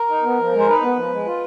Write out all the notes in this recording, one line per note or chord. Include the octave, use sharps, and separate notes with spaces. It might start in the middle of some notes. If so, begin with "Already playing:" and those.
Already playing: A#4
D#4
B3
F3
G#3
C5
D#4 B4
B3
F3
G#3
F4